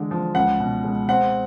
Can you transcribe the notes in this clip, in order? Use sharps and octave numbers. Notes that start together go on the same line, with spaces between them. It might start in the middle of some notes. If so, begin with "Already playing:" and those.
Already playing: D3 E3 G#3
F3
C#2 F#5
B2
G#3
C4 F#5